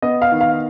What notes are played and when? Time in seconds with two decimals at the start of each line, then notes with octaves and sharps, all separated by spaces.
0.02 B3 D#5
0.22 F5
0.32 D#3
0.41 F5